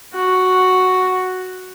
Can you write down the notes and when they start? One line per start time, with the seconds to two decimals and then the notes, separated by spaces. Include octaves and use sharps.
0.13 F#4